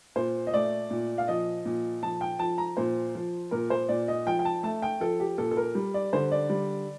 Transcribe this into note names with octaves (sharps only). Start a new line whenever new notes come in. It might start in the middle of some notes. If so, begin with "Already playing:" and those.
A#2 C5
D#5
A3 D5
A#2
F5
F3 D#5
A#2
F3 A5
G5
F3 A5
A#5
A#2 C5
F3
A#2 A#4
C5
A#2 D5
D#5
F3 G5
G5
A5
A3 A5
G5
F3 A4
G4
A#2 A4
A4
A#4
G3
D5
D3 C5
D5
G3